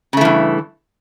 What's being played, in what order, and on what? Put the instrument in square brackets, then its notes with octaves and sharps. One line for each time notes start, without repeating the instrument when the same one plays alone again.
[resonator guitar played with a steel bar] C#3
A3
E3
G2